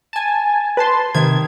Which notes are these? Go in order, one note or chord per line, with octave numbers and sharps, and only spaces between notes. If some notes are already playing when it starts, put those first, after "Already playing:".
G#5 A5
B4 A5 C6
C3 D#3 G#6